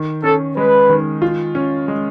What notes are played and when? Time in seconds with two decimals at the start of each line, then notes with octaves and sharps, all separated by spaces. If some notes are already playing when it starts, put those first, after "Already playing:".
Already playing: D#3
0.24 C#4 A4
0.56 G#3 B4
0.89 D#3
1.22 F4
1.55 C#4
1.88 G#3